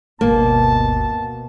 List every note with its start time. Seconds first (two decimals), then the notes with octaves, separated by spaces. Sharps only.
0.21 G1 D2 B2 A#3 A5